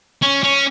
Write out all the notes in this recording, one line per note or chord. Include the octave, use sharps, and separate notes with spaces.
C#4
C#4